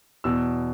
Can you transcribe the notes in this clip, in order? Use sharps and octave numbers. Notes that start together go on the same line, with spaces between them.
E2 B2 E6